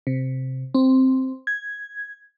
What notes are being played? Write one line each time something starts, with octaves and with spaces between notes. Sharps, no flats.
C3
C4
G#6